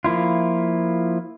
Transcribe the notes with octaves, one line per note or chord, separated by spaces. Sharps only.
F3 A#3 E4 F4